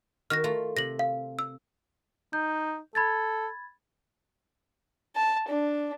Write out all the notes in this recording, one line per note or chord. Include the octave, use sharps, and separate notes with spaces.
D#3 F#4 F6 A#6
A3 F4 A#5
C3 A#6 F#7
F5
E6
D#4 G6
A4 B5 G#6 A6
A5
D4